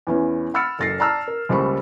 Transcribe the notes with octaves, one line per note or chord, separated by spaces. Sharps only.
E2 E3 C#4
F#5 B5 E6 F6 A6 C#7
F#1 A4 A6 A#6 C7
D5 A5 A#5 E6 F6
A#4
C#2 G3 A#3 C5 B5 C#6